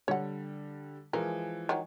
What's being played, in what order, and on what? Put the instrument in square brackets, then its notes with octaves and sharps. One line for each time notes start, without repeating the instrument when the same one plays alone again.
[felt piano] D3 G3 [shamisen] C#5 F#5
[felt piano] E3 F3 G#3 [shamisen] A#4
[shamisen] D#3 F#3